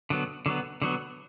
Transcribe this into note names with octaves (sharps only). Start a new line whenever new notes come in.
D3 F#3 B3
D3 F#3 B3
D3 F#3 B3